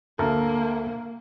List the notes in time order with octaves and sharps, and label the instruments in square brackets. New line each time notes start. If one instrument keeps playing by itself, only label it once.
[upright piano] D2 [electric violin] A#3 [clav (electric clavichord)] A4 A#4